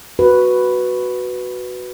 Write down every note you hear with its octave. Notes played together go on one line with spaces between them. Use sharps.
F#4 B4